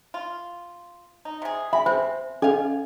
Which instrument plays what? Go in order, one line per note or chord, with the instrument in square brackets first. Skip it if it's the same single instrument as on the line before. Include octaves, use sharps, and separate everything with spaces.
[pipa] F4
D#4
C3 G#4
[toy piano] E5 G#5 [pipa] B5
[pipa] C4 [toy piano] C5
[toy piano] C#4 A4 D#5 [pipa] F5 G#5